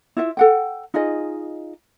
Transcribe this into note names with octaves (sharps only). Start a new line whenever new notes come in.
E4 F4 E5
A4 F#5 G5
D#4 F4 G#4 D#5